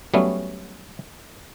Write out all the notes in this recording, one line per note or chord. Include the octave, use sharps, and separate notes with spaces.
F#3 G3 A3 B3 C#4